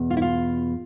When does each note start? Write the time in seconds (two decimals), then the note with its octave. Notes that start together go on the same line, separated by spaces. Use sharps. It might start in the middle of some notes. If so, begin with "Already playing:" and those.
Already playing: E2 B2
0.10 F4
0.17 E4
0.22 F4